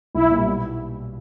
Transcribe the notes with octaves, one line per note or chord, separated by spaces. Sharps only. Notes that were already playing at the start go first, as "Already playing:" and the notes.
B1 E4
A#2
G3
B2